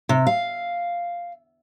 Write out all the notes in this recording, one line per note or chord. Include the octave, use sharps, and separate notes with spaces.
C3
F5